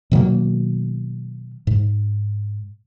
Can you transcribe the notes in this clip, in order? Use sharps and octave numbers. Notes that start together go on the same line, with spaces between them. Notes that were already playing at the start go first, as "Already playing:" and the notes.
B2 D#3 F#3 A#3
G#2